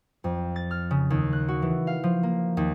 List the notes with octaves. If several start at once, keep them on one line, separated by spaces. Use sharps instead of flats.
F2
A6
F6
C#3
D#2
F#6
F#4
E3
F5
F3
A#3
D#2